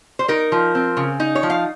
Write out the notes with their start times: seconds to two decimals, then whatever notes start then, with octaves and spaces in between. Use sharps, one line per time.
0.19 C5
0.28 D#4 A#4
0.52 F3
0.75 C4
0.97 C#3
1.20 D#4
1.35 C#5
1.43 F3
1.50 F5